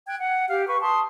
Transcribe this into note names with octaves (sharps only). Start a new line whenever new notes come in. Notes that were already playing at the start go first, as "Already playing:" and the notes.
G5 F#6 G#6
F#5
G4 F5
B4 C#6
A5 C6 D#6